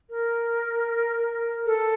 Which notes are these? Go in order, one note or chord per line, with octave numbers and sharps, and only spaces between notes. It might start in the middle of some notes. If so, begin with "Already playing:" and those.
A#4
A4